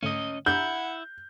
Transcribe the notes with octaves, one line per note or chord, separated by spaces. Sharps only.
G#2 D3 A3 C#4 D#5
D4 E4 G4 F#5 A#5 G6